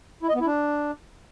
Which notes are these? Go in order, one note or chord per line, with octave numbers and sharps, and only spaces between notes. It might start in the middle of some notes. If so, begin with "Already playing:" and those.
E4
D#5
B3
E4
D4